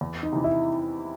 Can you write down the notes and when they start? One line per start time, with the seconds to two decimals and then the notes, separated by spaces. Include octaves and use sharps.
0.01 E2
0.23 D#4
0.32 C3 E3
0.44 E4